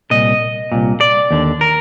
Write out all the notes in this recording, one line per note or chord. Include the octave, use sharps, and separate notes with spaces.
C2 A#2 D#5
C2 A#2
D5
D#2 D3
A#4